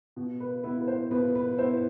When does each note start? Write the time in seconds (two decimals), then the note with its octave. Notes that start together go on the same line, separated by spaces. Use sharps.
0.16 B2
0.40 B4
0.63 B3 E4 B4
0.81 B4
0.87 C5
1.11 B2 B4
1.35 B4
1.58 E4 C5
1.62 B3